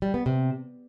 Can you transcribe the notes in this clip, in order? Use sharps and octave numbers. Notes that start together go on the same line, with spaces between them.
G3
B3
C3